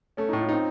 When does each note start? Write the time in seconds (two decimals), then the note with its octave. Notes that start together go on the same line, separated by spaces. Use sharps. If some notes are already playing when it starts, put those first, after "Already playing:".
0.17 A3 C#4
0.29 A2 D#4
0.40 F4
0.49 C4 D#4